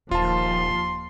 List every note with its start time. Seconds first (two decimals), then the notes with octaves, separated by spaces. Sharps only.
0.11 D#1 D#2 F3 F4 A5 C6